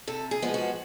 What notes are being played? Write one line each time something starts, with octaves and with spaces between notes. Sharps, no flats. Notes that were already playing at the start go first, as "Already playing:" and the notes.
C3 A4
G#4
F3 G#3 B3
F#4